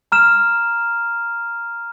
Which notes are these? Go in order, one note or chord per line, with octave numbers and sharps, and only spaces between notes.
A#5 F6 E7